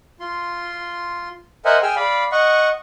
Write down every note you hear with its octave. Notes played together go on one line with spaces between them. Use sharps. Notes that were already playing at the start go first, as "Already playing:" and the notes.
F4 C6
A#4 C5 D#5 E5 F#5 G#5
G#4 G5 G#5 E6 F6
D5 F5 B5
D#5 F#5 C#6